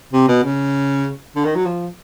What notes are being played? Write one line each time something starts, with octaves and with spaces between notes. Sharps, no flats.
C3
B2
C#3
D3
D#3
F#3
F3